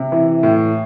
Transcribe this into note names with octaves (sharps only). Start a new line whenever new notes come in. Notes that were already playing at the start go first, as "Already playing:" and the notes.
Already playing: C3
E3
A2